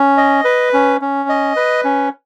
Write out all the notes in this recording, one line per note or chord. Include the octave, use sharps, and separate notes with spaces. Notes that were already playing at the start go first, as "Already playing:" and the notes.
Already playing: C#4
D#5
B4
C#4
C#4
D#5
B4
C#4